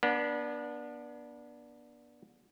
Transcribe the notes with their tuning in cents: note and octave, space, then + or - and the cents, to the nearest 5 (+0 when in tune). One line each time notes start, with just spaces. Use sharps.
B3 -35 D4 +0